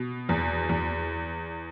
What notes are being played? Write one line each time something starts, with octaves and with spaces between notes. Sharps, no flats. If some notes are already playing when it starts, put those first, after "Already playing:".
Already playing: B2
E2
E2